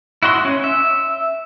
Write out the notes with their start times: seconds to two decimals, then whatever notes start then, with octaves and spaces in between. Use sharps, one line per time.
0.23 E4 F#4 D#5 C6
0.45 C#4
0.64 E5